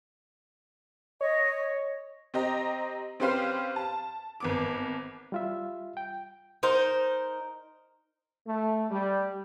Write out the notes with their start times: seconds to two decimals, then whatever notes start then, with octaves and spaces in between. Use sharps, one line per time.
1.21 C#5 D#5
2.34 C4 G4 D#5 A#5
3.20 C4 C#4 G4 B4 C5 F5
3.76 A5
4.40 G#1 B3 D6
5.32 G3 F4 E5
5.97 G5
6.63 D#4 A#4 C5
8.47 A3
8.91 G3